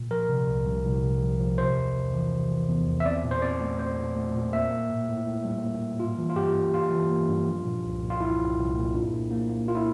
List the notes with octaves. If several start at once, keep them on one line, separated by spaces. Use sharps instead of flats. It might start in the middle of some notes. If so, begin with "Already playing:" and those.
Already playing: A#2
F3 A#4
C3
C2
C2
C2
C3
F3
F3
C3 C5
E2
E2
E3
C3
E3
E2
E2
E5
C4 D5
A#2
C5
C4 D5
A3
C4 C5
A#2
A3
A#2
A#3 E5
A#3
A2
A2
A2
G3
A#3
G3
A#3 F4
E3
F4
G2 G4
G2
G2 F4
E3
A#3
G2
F3
A#2
C2
A#2
F4
C2 E4
C2
C2
A#2
D4
A#2
A#3
A#3
A#3 F4
E4